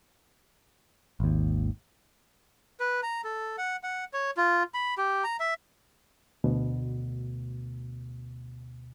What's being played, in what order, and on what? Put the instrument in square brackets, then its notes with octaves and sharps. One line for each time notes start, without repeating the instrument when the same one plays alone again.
[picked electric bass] G#1 D#2
[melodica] B4
A#5
A4
F#5
F#5
C#5
F4
B5
G4
A#5
E5
[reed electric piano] D2 B2